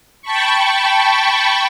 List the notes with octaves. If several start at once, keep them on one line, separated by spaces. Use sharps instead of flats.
G5 A5 B5 C#6